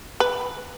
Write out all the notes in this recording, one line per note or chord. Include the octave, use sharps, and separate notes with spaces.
B4